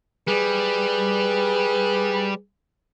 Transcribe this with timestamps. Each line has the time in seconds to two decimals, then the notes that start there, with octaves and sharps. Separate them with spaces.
0.27 G3 G#4 B4